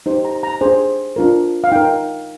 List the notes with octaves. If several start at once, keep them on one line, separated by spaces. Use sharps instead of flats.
D#4 G4 C5
A#5
A#5
D4 G#4 C5 G#5
D4 F4 A#4
F5
D#4 A#4 G5